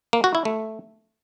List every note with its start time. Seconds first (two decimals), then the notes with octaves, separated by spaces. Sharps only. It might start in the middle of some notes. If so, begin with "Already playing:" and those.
0.13 A#3
0.24 F#4
0.35 E4
0.45 A3